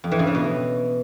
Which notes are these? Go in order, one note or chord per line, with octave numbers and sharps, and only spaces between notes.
F2
E3
C#3
E3
B2